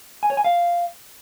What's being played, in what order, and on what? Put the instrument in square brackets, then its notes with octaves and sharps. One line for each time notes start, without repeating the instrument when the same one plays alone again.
[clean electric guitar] G#5
C#5
G#5
F5